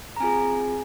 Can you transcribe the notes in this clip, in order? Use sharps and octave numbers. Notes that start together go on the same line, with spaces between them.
A#5
C4 F4 G#4 G#5